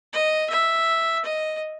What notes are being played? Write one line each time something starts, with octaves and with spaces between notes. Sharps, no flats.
D#5
E5
D#5